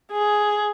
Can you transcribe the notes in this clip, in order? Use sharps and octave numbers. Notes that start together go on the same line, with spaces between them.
G#4